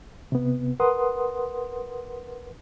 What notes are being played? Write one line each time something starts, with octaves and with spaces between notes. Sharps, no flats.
C3 B3
A#4 B4 F#5 C6 D#6